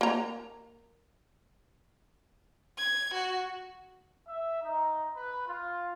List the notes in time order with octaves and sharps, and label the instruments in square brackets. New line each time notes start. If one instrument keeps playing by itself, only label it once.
[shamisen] A#3 A#5
[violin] G#6
F#4
[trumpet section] E5
D#4
B4
F4